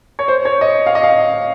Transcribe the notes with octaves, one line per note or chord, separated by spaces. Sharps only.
C#5
C5
C#5
D#5
F5
D#5
F5